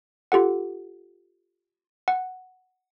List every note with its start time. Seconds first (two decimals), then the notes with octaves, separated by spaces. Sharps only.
0.32 F4 G4 A4 F#5
2.08 F#5